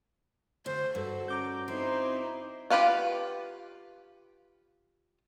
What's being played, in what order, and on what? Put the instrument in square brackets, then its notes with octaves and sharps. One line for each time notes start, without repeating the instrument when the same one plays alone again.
[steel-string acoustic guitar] D2 [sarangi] C5
[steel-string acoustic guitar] G2 [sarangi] F#4 [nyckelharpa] A4
[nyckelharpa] C#4 [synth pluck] A#5 D6 G6
[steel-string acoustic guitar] C4 [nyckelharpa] D#4 C5 [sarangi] E4
[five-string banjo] F4 G4 B4 F5 F#5